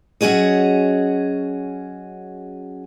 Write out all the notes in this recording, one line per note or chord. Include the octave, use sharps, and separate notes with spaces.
F#3 C#4 F#4 G#4 D#5